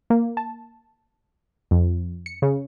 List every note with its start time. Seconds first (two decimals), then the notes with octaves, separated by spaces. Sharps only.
0.10 A#3
0.37 A5
1.71 F2
2.26 C#7
2.42 C#3